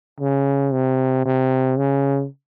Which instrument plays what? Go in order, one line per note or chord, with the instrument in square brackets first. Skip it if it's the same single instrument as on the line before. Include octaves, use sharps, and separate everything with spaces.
[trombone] C#3
C3
C3
C#3